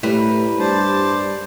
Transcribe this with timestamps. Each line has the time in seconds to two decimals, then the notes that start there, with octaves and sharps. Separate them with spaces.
0.03 A2 G3 A#4 B4
0.59 G2 C5 D5 A5